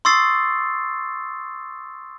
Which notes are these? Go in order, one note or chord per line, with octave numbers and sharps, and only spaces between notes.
C6 C#6 D#6 E6 A6 C7